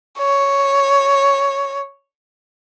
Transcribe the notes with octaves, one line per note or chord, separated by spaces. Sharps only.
C#5